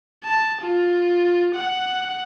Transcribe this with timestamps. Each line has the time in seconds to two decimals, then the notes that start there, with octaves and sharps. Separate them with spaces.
0.24 A5
0.61 F4
1.55 F#5